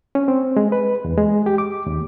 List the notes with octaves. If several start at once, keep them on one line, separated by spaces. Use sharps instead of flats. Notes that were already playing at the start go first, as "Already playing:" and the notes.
C#4
C4
G#3
B4
E2
G#3
G4
D6
D#2